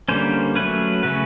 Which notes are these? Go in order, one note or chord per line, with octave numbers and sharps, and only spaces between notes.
D3 G3 A#3 C#4 C5
F#3 A3 C#4 B4
C#3 F#3 A3 C#4 B4